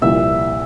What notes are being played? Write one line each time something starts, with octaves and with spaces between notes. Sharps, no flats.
C2 A#2 F3 E5